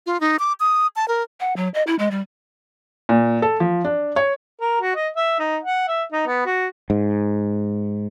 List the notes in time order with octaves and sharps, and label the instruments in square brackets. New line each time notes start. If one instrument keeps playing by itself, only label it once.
[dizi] F4
D#4
D6
D#6
A5
A#4
[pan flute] F#5
F#3
D#5
E4
G#3
G3
[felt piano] A#2
A4
F3
D4
C#5
[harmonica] A#4
F#4
D#5
E5
D#4
F#5
E5
D#4
B3
F#4
[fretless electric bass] G#2